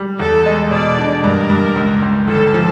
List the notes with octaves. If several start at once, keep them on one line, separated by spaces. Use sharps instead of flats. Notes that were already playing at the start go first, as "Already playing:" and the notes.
Already playing: G3
E2 A4
G#3
B2 D5
D4
G2 A#4
G2
C#2
C#2
G1 A4
F3